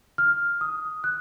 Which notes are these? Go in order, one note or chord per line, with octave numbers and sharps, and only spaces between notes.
F6
D#6
F#6